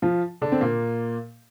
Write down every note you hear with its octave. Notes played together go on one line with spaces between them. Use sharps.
F3 F4
D3 D4
C4
A#2 A#3